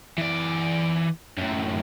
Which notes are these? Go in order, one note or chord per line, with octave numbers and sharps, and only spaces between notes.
E3 D5
F#2 A2